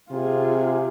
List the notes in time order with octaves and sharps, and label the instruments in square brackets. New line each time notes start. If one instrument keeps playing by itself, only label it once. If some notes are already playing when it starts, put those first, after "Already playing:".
[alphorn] C3 [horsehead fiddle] F4 G#4